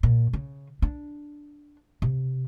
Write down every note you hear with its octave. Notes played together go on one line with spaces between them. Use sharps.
A#2
C#3
D4
C3